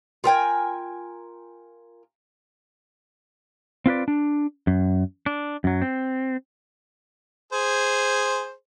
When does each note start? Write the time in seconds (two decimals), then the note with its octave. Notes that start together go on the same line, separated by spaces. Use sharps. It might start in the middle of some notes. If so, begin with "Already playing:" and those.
0.24 F4 A#4 G5 G#5
3.86 C4 F4 B4 D5
4.08 D4
4.67 F#2
5.26 D4
5.64 F#2 F#3
5.82 C4
7.53 G#4 C5